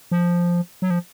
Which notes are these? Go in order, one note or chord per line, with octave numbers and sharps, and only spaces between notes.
F3
F#3
F3